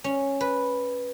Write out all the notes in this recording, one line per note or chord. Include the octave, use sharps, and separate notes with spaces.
C#4
B4